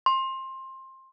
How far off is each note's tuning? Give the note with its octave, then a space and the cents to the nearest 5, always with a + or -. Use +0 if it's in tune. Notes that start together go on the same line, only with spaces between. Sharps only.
C6 +20